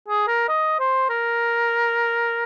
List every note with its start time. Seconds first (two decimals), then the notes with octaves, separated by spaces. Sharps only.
0.08 G#4
0.28 A#4
0.49 D#5
0.80 C5
1.10 A#4